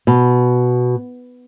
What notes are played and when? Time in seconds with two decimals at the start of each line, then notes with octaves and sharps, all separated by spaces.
0.07 B2